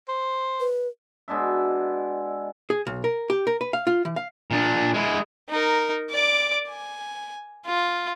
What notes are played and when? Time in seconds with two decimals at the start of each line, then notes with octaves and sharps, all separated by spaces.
0.09 C5
0.60 B4
1.28 B2 G#3 D4 E5
2.70 G#4
2.87 B1
3.04 A#4
3.30 G4
3.47 A#4
3.61 B4
3.73 F5
3.87 F4
4.05 E3
4.16 F5
4.51 A#2 D4
4.94 G#3 E4
5.50 D#4 A#4
6.11 D5 D6
6.69 G#5
7.66 F4